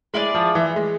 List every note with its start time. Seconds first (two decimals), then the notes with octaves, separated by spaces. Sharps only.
0.14 G#3 E4 G#4 D5
0.35 F3
0.55 E3
0.76 G#3